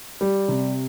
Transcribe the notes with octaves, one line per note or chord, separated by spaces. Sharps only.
G3
C3